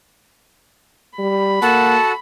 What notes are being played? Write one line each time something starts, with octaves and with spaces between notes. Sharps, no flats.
G3 B5
A#3 F#4 A4 F#5 A5